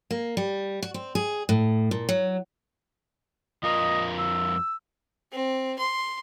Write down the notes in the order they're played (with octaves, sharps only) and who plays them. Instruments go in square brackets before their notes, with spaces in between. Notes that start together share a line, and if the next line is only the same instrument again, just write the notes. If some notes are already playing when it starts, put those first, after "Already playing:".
[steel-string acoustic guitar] A#3
G3
F#4
C4
G#4
A2
A#2
F#3
[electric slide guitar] F2 F4 A#4 [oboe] D#5
[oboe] E6
[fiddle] C4
C6